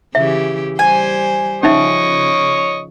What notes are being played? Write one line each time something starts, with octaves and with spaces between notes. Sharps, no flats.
C#3 E3 G4 E5
G3 C5 G#5
C#3 F3 C#4 D#4 C#5 D#5 E5 C#6